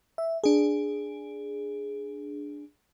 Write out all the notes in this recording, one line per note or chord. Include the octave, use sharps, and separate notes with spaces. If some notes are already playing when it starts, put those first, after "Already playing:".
E5
D4 G#4